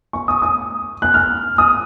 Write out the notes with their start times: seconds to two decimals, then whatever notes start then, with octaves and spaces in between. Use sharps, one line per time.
0.13 C#6
0.28 D#6
0.42 D#6
1.02 F#6
1.14 F6
1.58 D#6